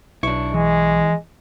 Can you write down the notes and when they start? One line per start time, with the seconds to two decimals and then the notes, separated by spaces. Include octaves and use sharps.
0.23 B1 D4 E4 C#6
0.54 E3 G#3